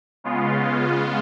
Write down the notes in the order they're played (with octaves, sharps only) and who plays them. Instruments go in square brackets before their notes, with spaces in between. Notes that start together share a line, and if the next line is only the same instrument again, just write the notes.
[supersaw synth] C#3 G#3 B3 F4